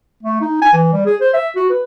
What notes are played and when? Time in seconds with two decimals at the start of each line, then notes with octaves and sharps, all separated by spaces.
0.23 A3
0.41 D#4
0.62 G#5
0.73 E3
0.93 G3
1.06 G#4
1.21 C5
1.34 E5
1.56 F#4
1.70 B4